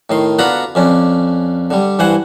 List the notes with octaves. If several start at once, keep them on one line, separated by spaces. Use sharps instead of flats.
A2 D#3 C6
D3 B3 F4 F#4 A#5 B5
F2 C#4 D4
D3 G3
G2 E3 C5 F#5 G#5